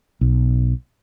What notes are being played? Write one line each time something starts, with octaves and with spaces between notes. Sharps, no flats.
B1